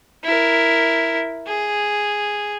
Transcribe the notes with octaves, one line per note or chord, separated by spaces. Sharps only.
E4 A#4
G#4